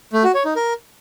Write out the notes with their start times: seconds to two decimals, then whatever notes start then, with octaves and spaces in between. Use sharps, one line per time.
0.13 A3
0.24 F#4
0.34 C#5
0.45 D#4
0.56 A#4